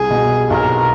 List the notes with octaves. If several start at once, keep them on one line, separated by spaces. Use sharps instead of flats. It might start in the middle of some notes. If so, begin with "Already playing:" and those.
Already playing: C2 G#4
B2
B1 A#4